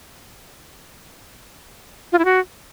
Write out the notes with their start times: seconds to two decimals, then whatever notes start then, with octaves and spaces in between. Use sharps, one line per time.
2.12 F4
2.19 E4
2.25 F#4